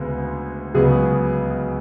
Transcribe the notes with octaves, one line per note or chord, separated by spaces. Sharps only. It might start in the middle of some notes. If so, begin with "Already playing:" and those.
Already playing: D2 C#3 G#3 B3
C#2 C#3 F#3 B3 G#4